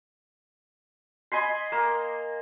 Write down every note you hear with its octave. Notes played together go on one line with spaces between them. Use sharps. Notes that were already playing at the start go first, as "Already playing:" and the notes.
D#5 G#5 B5 C6
A#3